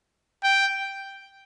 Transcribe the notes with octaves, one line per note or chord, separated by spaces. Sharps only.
G5